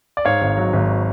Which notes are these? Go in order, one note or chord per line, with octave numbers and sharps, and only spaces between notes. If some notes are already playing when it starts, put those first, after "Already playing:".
D5
G#2 C#5 F5
G#1
F#3
G#1